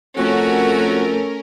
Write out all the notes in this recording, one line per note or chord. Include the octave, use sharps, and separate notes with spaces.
F2 A3 C#4 F#4 A#4